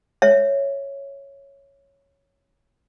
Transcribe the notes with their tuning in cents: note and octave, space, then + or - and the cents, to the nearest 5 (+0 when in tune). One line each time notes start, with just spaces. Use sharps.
C#5 +0 E5 +5